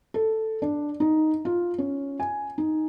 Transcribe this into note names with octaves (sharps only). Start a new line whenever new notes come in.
A4
D4
D#4
F4
C#4
G#5
D#4